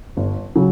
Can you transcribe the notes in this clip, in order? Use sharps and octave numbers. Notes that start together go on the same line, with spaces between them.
G1
C#3 F#3